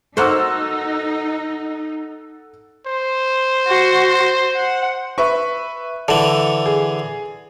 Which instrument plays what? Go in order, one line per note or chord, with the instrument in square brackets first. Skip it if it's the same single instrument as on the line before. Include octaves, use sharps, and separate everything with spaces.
[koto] A#3 F#4 C5 [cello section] D#4 [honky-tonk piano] A4 F#5 E6
[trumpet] C5
[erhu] F#4
F#5
[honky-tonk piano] B4 E5 C#6
[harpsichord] D3 E3 [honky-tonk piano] A4 F#7
[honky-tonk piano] G#4